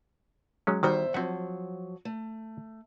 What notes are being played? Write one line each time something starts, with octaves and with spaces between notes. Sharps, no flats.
F#3 G#3 C#4
E2 D#3 G3 F#4 C5 E5
F3 F#3 C4 E5 F#5
A3